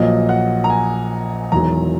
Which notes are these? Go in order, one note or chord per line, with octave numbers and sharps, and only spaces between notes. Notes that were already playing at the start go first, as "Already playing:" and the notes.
Already playing: A#1 A#2 F#3 D#5
F#5
A#5
G#5
E1 E2 D#3 F#3 A#5